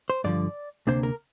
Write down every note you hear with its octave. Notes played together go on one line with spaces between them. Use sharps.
C5
G2 D3 F3 D5
D2 C3 A#3 D4 C5
A#4